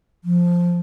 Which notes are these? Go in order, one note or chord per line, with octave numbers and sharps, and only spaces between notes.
F3